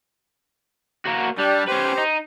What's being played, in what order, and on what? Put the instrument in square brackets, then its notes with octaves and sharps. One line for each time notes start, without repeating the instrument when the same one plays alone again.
[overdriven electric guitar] A#3 F#4
[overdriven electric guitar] G3 [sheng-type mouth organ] D4 G4 D5
[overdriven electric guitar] C#4 B4 [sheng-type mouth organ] G4 C5
[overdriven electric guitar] D#4